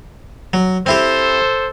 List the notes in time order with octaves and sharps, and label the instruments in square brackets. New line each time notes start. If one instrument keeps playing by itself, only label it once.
[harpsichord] F#3
[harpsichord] C4 E4 G4 [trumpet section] A4 C5